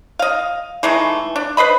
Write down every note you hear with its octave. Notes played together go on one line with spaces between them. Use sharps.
D#5 F5
E3 G#3 A3 D#4
D4
B4 C5 D#5 B5